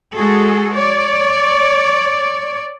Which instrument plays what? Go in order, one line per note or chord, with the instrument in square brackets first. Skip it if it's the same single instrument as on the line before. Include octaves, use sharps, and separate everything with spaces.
[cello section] G#3 F#4 G#4 A4
C#5 D5